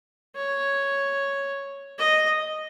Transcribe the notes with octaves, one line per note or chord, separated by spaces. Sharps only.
C#5
D#5